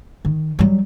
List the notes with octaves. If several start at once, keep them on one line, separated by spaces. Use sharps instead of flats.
D#3
F#3 G3